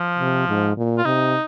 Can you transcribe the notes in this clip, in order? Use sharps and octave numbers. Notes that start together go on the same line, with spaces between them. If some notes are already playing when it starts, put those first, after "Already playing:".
Already playing: F3
C3
G#2
A#2
F4
C3 D#4